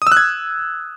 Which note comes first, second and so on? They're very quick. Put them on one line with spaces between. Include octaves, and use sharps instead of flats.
D#6 E6 F#6 G#6